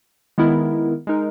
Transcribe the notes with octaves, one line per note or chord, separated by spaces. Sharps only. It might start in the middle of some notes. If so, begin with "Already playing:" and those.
D#3 G#3 B3 E4 A#4
G#3 D#4 A#4